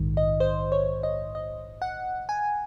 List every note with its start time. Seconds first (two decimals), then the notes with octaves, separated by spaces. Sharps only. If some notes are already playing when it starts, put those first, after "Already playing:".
Already playing: A#1 G#2 D#3
0.17 D#5
0.40 C5
0.72 C#5
1.03 D#5
1.35 D#5
1.82 F#5
2.29 G#5